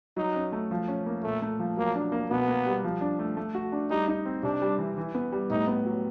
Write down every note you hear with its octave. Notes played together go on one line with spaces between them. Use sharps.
F#3 D#4
C#4
A3
F3
C#4
A#3
A#2 A3
A3
F3
F#3 A#3
D4
A#3
B2 B3
A#3
G3
F3
D4
A3
A3
F#4
D4
G3 D#4
D#4
C4
C3 D4
G3
E3
E3
B3
G3
A2 D#4
B3
F#3